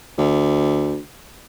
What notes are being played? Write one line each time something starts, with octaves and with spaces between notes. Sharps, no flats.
D2